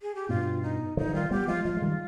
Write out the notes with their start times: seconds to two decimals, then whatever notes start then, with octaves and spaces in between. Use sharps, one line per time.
0.02 G#4
0.15 G4
0.29 G2 B2 F4
0.63 D#4
0.97 D3 F3 D#4
1.09 F3
1.14 D#3 G3 F4
1.31 G3 B3 G4
1.48 F3 G#3 F4
1.65 F3 G#3 F4
1.77 G#3
1.82 D#3 G3